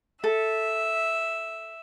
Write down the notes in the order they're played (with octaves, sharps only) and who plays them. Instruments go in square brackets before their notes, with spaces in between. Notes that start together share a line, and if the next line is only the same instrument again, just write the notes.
[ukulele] A4 [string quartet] E5